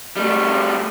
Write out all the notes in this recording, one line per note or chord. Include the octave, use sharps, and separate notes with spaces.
G3 A3